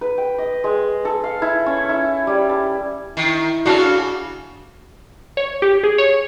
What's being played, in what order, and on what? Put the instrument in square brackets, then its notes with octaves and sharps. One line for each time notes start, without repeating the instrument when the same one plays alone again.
[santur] B4
G5
D#5
G#3
A4
F5
E4
C#4
E4
G3
A5
[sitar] D#3 [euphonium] E4
[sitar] C#3 D4 [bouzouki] F#4 A4 F5
[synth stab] C#5
G4
G#4
C#5